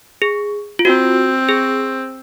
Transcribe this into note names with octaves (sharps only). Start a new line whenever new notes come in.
G#4
F4
C4 F#4
G#4